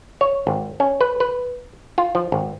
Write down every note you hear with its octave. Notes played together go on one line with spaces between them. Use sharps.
C#5
G#1
C#4
B4
B4
F4
F3
G#1